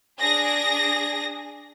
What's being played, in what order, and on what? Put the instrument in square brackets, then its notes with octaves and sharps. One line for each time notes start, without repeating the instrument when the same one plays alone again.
[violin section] D4 G#4 A#6